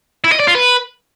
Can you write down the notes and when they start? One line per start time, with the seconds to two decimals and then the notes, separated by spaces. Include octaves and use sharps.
0.24 E4
0.32 D#5
0.40 D5
0.47 F4
0.55 B4